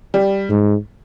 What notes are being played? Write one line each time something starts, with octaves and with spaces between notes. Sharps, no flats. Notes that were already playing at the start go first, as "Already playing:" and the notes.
G3
G#2